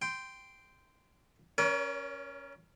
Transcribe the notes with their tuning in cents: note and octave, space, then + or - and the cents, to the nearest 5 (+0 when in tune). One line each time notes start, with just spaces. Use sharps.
G5 +0 C6 -15
C#4 +0 A#4 +30 C#5 +40